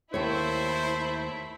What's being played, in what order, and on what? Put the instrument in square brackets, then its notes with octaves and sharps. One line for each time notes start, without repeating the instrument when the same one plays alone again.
[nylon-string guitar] D#2 C#5 [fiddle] A3 E5 [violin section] E4 [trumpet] C5